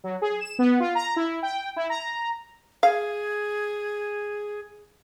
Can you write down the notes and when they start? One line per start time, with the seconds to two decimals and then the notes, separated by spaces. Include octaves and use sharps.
0.04 F#3
0.22 G#4
0.41 E7
0.59 B3
0.80 F4
0.95 A#5
1.16 E4
1.43 G5
1.76 E4
1.90 A#5
2.83 G#4 F5